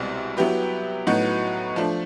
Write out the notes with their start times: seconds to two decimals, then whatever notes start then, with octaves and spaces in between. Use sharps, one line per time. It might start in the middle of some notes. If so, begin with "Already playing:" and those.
Already playing: C2 B2 G#3 C4 E4
0.37 F#3 B3 E4 G4 B4
1.07 A2 F#3 B3 D#4 F#4
1.76 F3 A3 D4